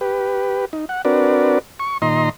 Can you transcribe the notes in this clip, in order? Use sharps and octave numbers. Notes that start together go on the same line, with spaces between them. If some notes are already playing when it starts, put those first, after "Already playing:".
G4 B4
D#4
F#5
C4 D4 F#4 A#4 B4 D5
C#6
A#2 D#3 D#5 A#5 C6